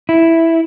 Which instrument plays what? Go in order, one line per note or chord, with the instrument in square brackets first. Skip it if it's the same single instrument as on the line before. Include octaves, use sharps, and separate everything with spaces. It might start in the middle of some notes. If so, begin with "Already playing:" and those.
[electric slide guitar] E4